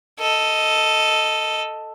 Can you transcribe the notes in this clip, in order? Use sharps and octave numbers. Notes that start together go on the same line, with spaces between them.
A4 D#5